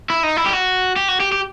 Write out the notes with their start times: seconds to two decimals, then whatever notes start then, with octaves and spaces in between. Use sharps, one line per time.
0.10 E4
0.23 D#4
0.37 E4
0.46 G4
0.53 F#4
0.96 G4
1.08 F#4
1.20 G4
1.32 G4